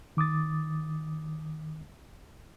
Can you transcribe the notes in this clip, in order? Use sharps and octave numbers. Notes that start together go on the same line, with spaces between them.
D#3 D6 D#6 A6